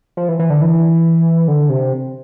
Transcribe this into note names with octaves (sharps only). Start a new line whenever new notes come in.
F3
E3
E3
D3
E3
D3
C3